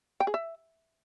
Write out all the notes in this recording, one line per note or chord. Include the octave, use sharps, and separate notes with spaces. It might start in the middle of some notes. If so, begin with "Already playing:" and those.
G5
G#4
E5